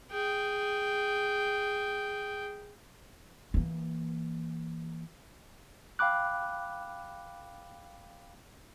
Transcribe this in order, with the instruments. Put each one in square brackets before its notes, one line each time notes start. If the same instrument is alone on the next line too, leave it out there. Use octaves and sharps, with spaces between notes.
[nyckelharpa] G#4 G5
[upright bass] E3 A#3
[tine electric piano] F5 G5 B5 D6 F#6